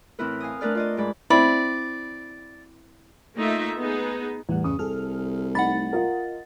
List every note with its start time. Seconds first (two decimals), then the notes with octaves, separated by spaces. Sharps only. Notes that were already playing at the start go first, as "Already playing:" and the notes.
0.19 A2 E3 C4 E4 A#4 B4
0.40 F5 G#5 D#6
0.61 A3 D4 A#4 B4 D5 F6
0.75 F4 D5 D#5
0.97 G#2 G#3 D5 B5
1.30 C4 E4 D5 B5
3.36 A3 A#3 D#4 F4 E5
3.78 B3 D#4 G#4
4.49 E2 A2 G3 F#5
4.64 E2 G2 C#3 D#6
4.79 C2 G#4 A4 F6
5.55 A3 D#4 F#5 B5 A6
5.93 F4 A#4 D#5